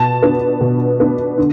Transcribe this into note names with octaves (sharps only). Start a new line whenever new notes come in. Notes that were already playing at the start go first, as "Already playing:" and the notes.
Already playing: B2 A5
B3 D4
B2
B3 D4
D3